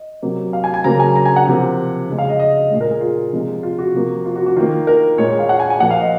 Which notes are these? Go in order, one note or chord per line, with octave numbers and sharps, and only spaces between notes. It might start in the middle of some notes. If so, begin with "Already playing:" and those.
Already playing: D#5
C3 F#3 A#3
F5
G#5
G#5
C#3 F#3 A#3 A#5
G#5
A#5
G#5
F#5
C3 F3 A#3
C#3 G#3
F5
D#5
D#5
A#2 G#3
A#4
G#4
F4
C3 F3 G#3
F4
F#4
C3 F3 A#3
F4
F#4
F#4
D#3 A#3 F4
A#4
A#2 G#3 C#5
C#5
F5
F#5
G#5
G#5
A#2 F3 A#3 F#5
F5
D#5